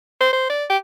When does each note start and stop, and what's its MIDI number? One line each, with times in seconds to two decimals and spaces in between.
0.21 0.32 72
0.33 0.47 72
0.50 0.65 74
0.70 0.77 67